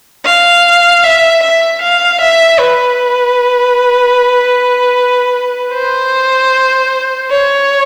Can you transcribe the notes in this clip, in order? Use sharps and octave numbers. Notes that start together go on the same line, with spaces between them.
F5
E5
E5
F5
E5
B4
C5
C#5